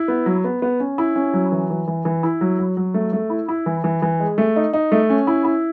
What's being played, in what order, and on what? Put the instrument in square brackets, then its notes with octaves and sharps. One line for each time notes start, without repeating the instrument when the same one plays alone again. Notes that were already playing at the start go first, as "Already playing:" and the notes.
Already playing: [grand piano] E4
B3
F#3
B3
B3
C#4
E4
C#4
F#3
E3
E3
E3
E3
E4
F#3
F#3
F#3
A3
A3
E4
E4
E3
E3
E3
G#3
A3
D#4
D#4
A3
C#4
E4
E4